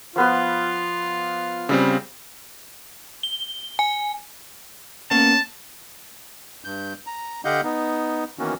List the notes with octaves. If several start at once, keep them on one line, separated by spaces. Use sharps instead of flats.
F3 B3 F4 B4
C#3 G3 C4 E6
G7
G#5
A#3 B3 C#4 A5
G2 G6
A#5
D3 G4 D#5 F5 F#5 G6
B3 D#4
D#3 E3 A#3 B3 C#4 F#4